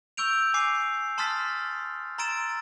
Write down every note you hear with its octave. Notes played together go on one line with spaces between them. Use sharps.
C#6 E6 G6 D7 F7
G#5 D6 C7
A5 C6 D#6 F6 A6 B6
A#5 C6 E6 A6 D7 E7